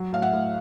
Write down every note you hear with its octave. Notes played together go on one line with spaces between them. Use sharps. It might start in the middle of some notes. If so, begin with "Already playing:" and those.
Already playing: F#3
A2 F5
E5 F#5
A2